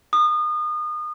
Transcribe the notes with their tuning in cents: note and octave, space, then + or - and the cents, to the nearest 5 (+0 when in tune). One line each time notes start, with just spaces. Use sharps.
D#6 -30